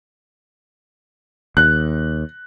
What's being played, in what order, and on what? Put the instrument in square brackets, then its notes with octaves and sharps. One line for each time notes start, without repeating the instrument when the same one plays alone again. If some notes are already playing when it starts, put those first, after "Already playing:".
[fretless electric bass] D#2 [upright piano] F#6